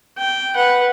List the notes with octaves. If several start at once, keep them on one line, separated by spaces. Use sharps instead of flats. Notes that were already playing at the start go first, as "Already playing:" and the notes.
G5
B4 F#5